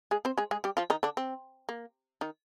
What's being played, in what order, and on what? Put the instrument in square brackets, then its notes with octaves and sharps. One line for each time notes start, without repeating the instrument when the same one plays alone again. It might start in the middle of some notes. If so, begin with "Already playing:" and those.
[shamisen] G#3 G#4
C4 C5
G#3 G#4
G#3 G#4
G3 G4
F3 F4
D#3 D#4
D3 D4
C4
A#3
D#3 D#4